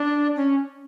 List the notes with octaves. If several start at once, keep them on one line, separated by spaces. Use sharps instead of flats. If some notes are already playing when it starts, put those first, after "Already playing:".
Already playing: D4
C#4